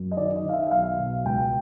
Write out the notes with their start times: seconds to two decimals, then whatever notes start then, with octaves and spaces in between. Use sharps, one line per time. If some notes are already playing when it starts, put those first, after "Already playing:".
Already playing: F#2
0.11 D#5
0.17 D#3 D5
0.36 D#5
0.44 D#3 F5
0.53 E5
0.67 E5
0.71 B1 F5
0.98 B2
1.25 C#2 G5